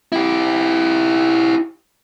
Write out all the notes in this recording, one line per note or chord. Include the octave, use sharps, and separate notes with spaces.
E4 G4